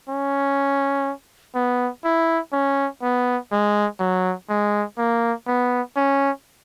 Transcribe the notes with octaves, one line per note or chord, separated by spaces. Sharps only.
C#4
B3
E4
C#4
B3
G#3
F#3
G#3
A#3
B3
C#4